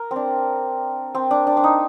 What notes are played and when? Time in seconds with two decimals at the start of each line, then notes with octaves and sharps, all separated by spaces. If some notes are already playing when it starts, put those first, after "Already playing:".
Already playing: A#4
0.11 C4
0.16 D4
1.15 C4
1.31 D4
1.47 D4
1.57 D4
1.64 D#4